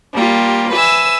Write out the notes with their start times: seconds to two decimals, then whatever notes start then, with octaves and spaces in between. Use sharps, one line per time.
0.15 G3 A#3 F4 G4
0.73 B4 E5 G#5 E6